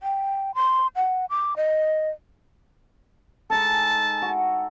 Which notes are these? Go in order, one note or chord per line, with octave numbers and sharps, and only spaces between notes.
G5
C6
F#5
D6
D#5
G#3 D#4 A4 A5
F#4